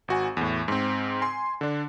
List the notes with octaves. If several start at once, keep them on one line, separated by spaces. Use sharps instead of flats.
G#1 F#4 G#5
E2 A2
G#2 C4
G#5 C6
D3 D4